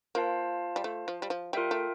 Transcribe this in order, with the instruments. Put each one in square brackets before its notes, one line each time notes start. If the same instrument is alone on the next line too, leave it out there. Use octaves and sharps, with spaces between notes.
[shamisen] A#3 [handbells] F4 C5 F5 A5
[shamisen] G3
A3
F3
G3
F3
[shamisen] G3 [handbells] F4 A#4 E5 G5
[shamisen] A3